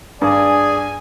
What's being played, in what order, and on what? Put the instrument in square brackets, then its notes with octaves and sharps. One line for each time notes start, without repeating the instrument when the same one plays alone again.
[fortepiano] G2 [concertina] G#4 [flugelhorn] D5 [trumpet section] G#5